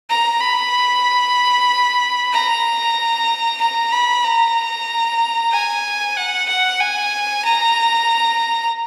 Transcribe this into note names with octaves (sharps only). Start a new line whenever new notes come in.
A#5
B5
A#5
A#5
B5
A#5
G#5
F#5
F#5
G#5
A#5